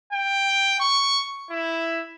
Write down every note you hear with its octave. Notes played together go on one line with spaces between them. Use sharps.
G5
C#6
E4